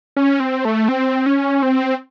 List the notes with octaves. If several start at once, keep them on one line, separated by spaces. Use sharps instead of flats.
C#4
C4
A3
C4
C#4
C4